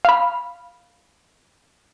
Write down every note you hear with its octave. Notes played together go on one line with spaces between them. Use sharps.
F5 B5